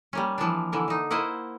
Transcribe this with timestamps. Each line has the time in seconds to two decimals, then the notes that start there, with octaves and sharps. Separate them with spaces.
0.13 G3 A#3 C#4
0.38 E3 F3 A#3 D4
0.72 D3 E3 A#4
0.88 D3 D#4
1.11 A#3 E4 C5 D#5 F#5